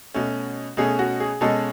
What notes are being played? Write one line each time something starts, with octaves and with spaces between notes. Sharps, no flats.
B2 A3 C#4
B2 A3 C#4 G#4
F#4
G#4
B2 G#3 C#4 A4